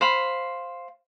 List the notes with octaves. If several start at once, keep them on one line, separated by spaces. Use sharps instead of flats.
C5 F5 B5